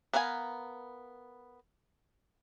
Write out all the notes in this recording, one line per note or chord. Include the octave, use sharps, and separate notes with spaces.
B3 A#4 B4 F5 G#5